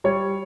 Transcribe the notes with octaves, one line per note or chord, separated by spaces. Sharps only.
G3 C#5